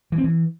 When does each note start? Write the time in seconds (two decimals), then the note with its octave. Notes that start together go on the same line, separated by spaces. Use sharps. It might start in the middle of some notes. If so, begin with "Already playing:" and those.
0.12 E3
0.18 C4
0.24 E3